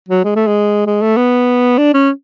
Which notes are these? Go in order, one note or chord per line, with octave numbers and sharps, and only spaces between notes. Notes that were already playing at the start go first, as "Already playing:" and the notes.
F#3
G#3
A3
G#3
G#3
A3
B3
D4
C#4